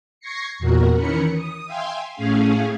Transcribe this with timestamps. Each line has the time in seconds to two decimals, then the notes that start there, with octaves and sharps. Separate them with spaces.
0.20 C#6 G#6 A#6 C7 C#7
0.59 E2 A#2 F#4 A#4
0.96 D#3 E3 C#4 A#4 B5 C#7
1.34 D#6
1.66 E5 F5 G5 G#5 C6
2.15 A2 A3 C#4 G#4 F5